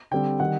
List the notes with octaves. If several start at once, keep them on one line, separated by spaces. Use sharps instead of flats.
D3 G3 C4 G5
D#3 G3 F#5